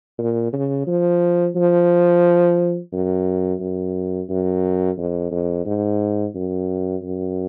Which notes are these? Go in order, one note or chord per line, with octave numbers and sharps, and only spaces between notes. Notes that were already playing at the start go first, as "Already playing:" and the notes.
A#2
C#3
F3
F3
F#2
F#2
F#2
F2
F2
G#2
F#2
F#2